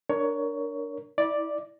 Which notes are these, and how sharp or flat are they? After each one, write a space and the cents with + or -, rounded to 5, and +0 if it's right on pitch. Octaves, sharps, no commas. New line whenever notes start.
D4 +0 A#4 +0 C#5 +15
E4 -30 D5 +0